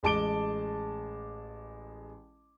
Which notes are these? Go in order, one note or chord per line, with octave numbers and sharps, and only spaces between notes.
A1 G#3 A5 D6 D7 G7